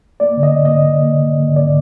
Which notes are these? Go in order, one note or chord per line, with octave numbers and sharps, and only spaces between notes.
A#3 D5
D3
D#5
A#3
D#5
D3
A#3
D3
A#3
D3
D3 D5